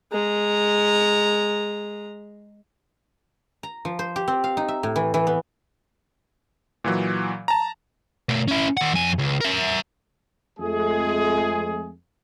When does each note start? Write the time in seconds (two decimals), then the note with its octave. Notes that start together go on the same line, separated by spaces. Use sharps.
0.12 G#3 A#5
3.63 A#5
3.85 F3
3.99 C5
4.16 G4
4.28 C4
4.44 F5
4.57 D#4
4.68 E5
4.83 A2
4.96 E3
5.14 E3
5.27 B3
6.84 A#2 E3 F#3
7.48 A5 A#5
8.29 B2 A3
8.48 C#4 E4
8.77 D#3 F#5
8.94 F2 G#5
9.19 C#2
9.41 A#4 E5
10.60 F2 G#3 A3 G#4